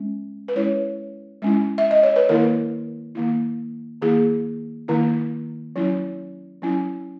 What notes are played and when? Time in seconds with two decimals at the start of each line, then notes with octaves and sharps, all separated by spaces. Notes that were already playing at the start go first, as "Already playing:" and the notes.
Already playing: G#3 C#4
0.48 B4
0.55 G#3 C#4 E4 C#5
1.42 G#3 C#4 E4
1.78 E5
1.91 D#5
2.03 C#5
2.16 B4
2.29 D#3 A#3 E4 A#4
3.15 D#3 A#3 E4
4.02 D#3 A#3 E4 G#4
4.88 D#3 A#3 E4
5.76 F#3 C#4 E4
6.62 F#3 C#4 E4